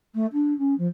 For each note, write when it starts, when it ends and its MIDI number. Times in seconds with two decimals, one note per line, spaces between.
0.14 0.26 57
0.33 0.56 62
0.58 0.74 61
0.78 0.87 53